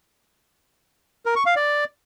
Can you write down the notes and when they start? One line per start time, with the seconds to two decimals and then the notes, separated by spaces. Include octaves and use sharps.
1.26 A#4
1.36 C#6
1.46 F5
1.56 D5